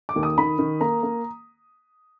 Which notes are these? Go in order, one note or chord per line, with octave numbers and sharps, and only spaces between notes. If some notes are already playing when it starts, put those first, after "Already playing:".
D6
D#2
D#6
D#3 B5
D#3
A#3 A#5
A#3